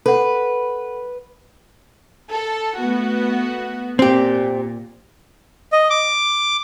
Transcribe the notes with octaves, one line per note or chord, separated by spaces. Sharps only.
A4 B4 F#5
A4
A3 B3 F#4
A#2 C4 G4
D#5
D6